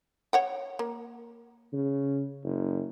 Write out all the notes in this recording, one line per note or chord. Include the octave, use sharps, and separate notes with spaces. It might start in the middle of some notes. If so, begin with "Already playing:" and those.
C#5 F#5 G5
A#3
C#3
F#1